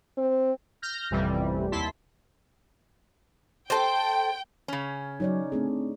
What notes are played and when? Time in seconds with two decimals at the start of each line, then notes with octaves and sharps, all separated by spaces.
0.18 C4
0.82 F6 G6 A#6
1.10 A1 F2 C3 E3 G3
1.72 D#2 E4 A5 C6 B6
3.70 A4 C5 G5
4.68 C#3 C#4
5.20 F#3 D#4 C#5 D5
5.52 A3 C4 D4 G#4